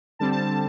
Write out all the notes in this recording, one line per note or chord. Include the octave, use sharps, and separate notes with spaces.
D3 G3 C4 A5
A5
A5